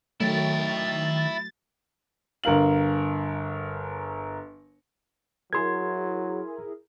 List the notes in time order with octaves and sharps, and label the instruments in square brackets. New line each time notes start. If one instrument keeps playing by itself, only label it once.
[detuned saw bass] D#3 [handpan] F#3 A3 [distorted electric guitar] E4 G5 [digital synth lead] A6
[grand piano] G1 A#4 F5 F#7
[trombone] F#3 [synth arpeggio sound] E4 G#4 A#4 [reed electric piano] C6 G#6